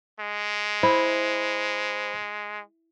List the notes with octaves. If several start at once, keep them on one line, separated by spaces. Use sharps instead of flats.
G#3
E4 C5 B5